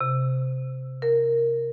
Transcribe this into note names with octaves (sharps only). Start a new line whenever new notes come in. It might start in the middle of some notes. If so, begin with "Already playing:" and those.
C3
A#4